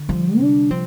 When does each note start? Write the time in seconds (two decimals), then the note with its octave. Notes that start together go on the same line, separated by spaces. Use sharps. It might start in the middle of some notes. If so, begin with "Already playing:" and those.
Already playing: D3
0.09 F3 G3
0.39 C3 D4
0.70 F3 C4